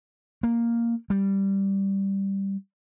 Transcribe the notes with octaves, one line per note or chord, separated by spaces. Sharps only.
A#3
G3